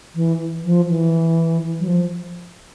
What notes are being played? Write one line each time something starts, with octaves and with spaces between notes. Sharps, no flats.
E3
F3
E3
F#3
F3